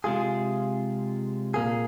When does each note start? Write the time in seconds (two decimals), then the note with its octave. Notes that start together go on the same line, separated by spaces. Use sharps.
0.04 C3 G#3 F4 G#4
1.54 A#2 A#3 G#4